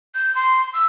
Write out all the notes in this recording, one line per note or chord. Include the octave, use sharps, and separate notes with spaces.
G6
C6
E6